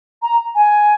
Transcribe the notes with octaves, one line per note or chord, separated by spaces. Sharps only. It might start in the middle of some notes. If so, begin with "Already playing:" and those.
A#5
G#5